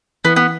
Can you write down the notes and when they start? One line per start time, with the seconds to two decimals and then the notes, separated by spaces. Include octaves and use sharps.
0.25 E3 B3
0.36 B3